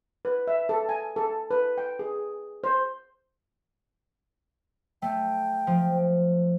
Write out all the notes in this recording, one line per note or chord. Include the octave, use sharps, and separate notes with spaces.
B4
E5
A4
G#5
A4
B4
G5
G#4
C5
A3 G5
F3